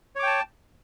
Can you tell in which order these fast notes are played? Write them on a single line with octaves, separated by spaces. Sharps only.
C#5 D6 G5 A5